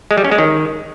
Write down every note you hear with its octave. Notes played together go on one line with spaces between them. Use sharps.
G#3
G3
C#4
G#3
D#3